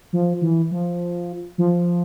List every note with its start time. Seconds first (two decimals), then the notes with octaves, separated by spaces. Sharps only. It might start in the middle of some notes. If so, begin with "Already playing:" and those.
0.13 F3
0.41 E3
0.71 F3
1.58 F3